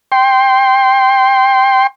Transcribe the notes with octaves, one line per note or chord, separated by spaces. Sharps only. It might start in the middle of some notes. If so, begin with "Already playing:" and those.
G5 C6